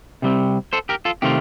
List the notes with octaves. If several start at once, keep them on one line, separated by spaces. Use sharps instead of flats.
C3 G3 C4
A4 C5
G4 A#4
F4 A4
C3 D#3 A3 C4 F4 G4